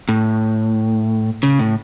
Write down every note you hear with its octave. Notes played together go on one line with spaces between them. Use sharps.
A2
C#3
A2